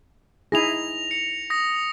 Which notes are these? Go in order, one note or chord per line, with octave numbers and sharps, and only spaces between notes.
D#4 E4 G#4 A#6 F7
C#7
D#6 A#6